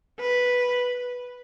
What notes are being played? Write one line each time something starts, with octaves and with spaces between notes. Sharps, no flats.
B4